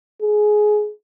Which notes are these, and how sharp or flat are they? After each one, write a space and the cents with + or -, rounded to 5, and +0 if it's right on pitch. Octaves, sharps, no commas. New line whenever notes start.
G#4 +20